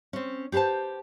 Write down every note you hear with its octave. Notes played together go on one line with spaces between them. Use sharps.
C4 C#4
G4 G#4 B4 C5 A5